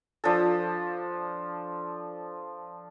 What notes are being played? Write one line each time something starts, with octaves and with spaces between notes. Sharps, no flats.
F3 D4 A4